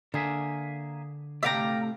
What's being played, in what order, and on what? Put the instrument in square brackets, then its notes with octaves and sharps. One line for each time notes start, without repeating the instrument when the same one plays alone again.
[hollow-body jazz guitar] D3 [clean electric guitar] A#3 G#4 E5
[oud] A2 C3 A3 [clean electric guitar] D5 G5 [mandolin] E5 F5 A#5